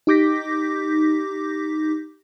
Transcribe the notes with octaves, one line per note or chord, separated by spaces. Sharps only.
D#4 G4 D6 G6 A#6 B6